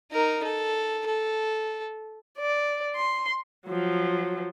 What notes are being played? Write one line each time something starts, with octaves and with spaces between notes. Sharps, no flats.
D#4 A#4
A4
A4
D5
C6
F3 F#3